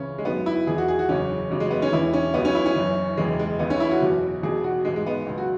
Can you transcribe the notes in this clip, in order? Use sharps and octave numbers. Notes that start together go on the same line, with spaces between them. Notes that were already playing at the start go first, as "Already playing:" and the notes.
Already playing: C#2 C#3 E3 C#4
G#3
G#1 F#2 F#3 B3
E4
E1 E2 E3 G#4
F#4
G#4
F#4
F#1 E2 C#3 C#4
F#1 E2 C#3 F#3
G#3
B3
C#4
E1 E2 E3 E4
C#4
C#2 C#3 F#3 B3
C#4
E4
C#4
F#1 F#2 E3
E1 E2 C#3 E3 G#3
G#3
C#2 C#3 E3 B3
C#4
E4
F#4
F#1 E2 B2 F#3
E1 E2 B2 G#4
F#4
G#1 G#2 E3 G#3
G#3
B3
C#2 B2 F#3
F#4